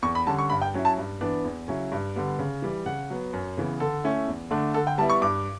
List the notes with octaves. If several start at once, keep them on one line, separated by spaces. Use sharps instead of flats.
E2 C#6
B5
D3 G3 C#4 A5
C#6
G2 B5
G5
F#3 C#4 E4
A5
G2
E3 B3 D4
E2
C#3 F#3 C#4 E4
G2
D3 G3 B3
C#3
E3 G3
C#3 F#5
F#3 B3
F#2
C#3 E3 B3
D3 A4
A3 C#4 E4
E2
D3 A3 D4
D3 A4
G5
G3 B3 E4 A5
C#6
G2 D6